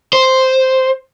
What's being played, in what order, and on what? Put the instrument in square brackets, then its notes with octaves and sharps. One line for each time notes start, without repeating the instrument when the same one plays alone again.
[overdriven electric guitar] C5